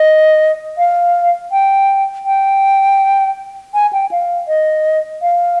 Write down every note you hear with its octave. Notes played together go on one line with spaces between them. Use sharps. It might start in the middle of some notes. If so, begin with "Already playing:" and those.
Already playing: D#5
F5
G5
G5
G#5
G5
F5
D#5
F5